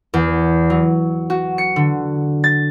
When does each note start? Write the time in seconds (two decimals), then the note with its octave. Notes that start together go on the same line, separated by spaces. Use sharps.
0.14 E2
0.70 F#3
1.30 F#4
1.58 C#7
1.76 D3
2.44 A6